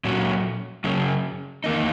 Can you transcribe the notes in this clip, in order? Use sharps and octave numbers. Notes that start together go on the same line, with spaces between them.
A#2 F#3 C#4 F#4
F#2 C#3 F#3 C#4 G#4
E2 D#3 A#3 D#4